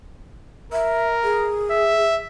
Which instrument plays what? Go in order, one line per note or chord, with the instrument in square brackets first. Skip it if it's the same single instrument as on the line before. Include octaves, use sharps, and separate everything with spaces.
[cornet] A#4 [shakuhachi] E5
[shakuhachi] G#4
[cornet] E5